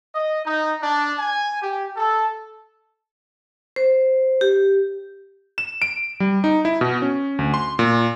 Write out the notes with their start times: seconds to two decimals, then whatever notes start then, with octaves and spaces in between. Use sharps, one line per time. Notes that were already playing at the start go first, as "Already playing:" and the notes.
0.14 D#5
0.46 D#4
0.82 D4
1.20 G#5
1.62 G4
1.97 A4
3.76 C5
4.41 G4
5.58 E7
5.82 D7
6.20 G3
6.44 D#4
6.65 E4
6.81 B2
7.02 C#4
7.39 D2
7.54 C6
7.79 A#2